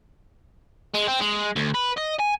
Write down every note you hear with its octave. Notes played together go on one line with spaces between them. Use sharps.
G#3
C4
G#3
D2
B4
D#5
G#5